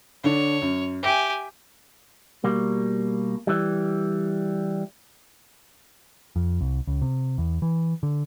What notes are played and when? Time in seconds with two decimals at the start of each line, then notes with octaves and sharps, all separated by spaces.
0.24 D3 D4 C#5
0.62 F#2
1.03 G4 E5 G5 G#5
2.44 B2 G3 A#3
3.47 E3 G3
6.36 F2
6.61 C2
6.87 C#2
7.02 C3
7.38 E2
7.62 E3
8.03 D3